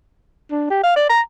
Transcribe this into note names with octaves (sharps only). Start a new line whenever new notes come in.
D4
G4
F5
D5
A#5